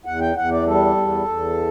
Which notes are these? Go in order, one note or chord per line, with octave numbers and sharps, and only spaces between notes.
E2 F#5
G5
E2 F#5
D5
G3 A4
E2
E2